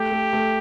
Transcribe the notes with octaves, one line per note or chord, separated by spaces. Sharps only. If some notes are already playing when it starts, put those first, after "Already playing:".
Already playing: A3 G4
A3
A3